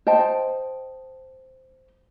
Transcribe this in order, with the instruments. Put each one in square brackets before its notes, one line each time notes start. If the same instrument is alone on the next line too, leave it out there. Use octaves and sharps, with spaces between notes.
[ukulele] C5 D#5 G5 A5